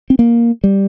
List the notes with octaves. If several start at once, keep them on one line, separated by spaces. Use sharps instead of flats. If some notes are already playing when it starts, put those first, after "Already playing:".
C4
A#3
G3